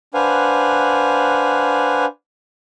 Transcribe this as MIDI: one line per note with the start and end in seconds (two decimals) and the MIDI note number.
0.14 2.05 62
0.14 2.05 71
0.14 2.05 72
0.14 2.05 77
0.14 2.05 78
0.14 2.05 80